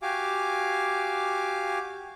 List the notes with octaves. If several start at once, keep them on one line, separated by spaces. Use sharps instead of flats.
F#4 G4 F5 G#5 D6